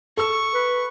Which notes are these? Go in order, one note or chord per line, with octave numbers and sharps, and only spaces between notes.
A4 C#6 E6
B4